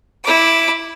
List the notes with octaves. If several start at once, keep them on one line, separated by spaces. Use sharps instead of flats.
E4 D6